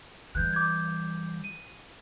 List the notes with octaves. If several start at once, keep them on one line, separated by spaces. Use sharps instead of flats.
E3 G3 F#6 G6
D6 G6 G#6
D#7